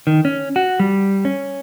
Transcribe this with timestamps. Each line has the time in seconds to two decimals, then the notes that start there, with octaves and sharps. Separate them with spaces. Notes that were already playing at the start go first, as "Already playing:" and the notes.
0.07 D#3
0.25 C#4
0.56 F#4
0.80 G3
1.25 C#4